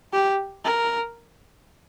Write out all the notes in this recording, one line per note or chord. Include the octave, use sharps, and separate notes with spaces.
G4
A#4